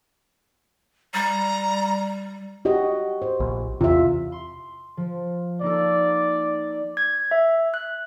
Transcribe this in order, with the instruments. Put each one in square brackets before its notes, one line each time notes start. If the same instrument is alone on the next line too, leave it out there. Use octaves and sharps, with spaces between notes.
[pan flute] G3 [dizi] A#5
[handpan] F#4 G4 D#5
C5
[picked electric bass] A#1
[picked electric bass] E2 C3 [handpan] F4 E5
[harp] C6
F3
[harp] A#3 D#4 A4 [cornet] D5
[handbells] G#6
E5
F#6